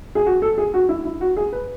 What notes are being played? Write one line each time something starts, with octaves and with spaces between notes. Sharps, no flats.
G#4
F#4
A4
G#4
F#4
E4
E4
F#4
G#4
B4